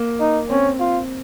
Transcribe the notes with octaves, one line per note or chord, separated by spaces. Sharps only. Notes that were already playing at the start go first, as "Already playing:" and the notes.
Already playing: A#3
D#4
C4 C#4
F4